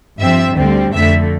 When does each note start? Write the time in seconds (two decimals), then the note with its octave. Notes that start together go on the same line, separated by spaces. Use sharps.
0.21 G2 F3 C4 E5
0.57 D2 D3 G3 C4
0.94 F2 D3 A3 E5